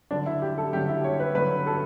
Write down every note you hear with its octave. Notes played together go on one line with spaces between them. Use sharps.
G2 D3 F#3 D4
E4
G4
A4
G2 D3 F#3 G4
E4
C#5
B4
G2 D3 F#3 B4
A4